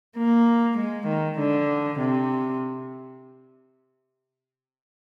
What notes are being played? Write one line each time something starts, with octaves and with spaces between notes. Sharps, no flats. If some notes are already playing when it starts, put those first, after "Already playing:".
A#3
G#3
D#3
D3
C3